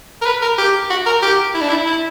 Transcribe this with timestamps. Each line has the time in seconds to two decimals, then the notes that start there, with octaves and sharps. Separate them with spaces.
0.22 A#4
0.26 B4
0.42 A#4
0.58 G4
0.90 F#4
1.06 A#4
1.22 G4
1.54 E4
1.61 D4
1.69 E4
1.86 E4